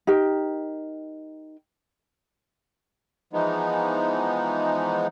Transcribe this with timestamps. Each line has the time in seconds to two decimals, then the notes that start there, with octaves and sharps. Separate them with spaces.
0.07 D#4 G4 A#4 G5
3.33 E3 F3 G#3 B3 D#4